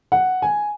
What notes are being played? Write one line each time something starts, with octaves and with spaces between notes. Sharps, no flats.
F#5
G#5